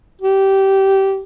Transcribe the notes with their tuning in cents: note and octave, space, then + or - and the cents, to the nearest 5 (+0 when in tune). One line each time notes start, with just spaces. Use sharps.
G4 -20